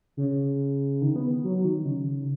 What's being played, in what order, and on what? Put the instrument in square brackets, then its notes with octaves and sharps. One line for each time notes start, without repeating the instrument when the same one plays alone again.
[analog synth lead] C#3
D#3
B3
F#3
D#3
C#3